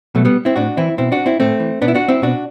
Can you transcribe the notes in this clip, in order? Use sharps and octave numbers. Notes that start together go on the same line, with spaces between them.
B2 F#3 A3
G3 B3
C4 E4
A2 D4 F#4
E3 C4 E4
B2 C4 E4
D4 F#4
C4 E4
A2 A3 C4
E3
B2 B3 D4
E4
D4 F#4
C4 E4
B2 D4 F#4